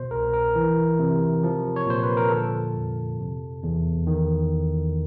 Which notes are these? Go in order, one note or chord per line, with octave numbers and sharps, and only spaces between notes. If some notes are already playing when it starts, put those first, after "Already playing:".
Already playing: B2 C5
C2 A#4
A#4
E3
C3
F3
C#5
A#2 C5
B4
A#4
D3 A4
F2
C3
E2
D#3